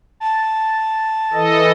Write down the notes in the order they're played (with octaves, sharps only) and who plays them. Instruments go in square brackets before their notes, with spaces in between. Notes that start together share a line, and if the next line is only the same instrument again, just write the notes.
[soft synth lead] A5
[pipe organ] E3 A4 D#5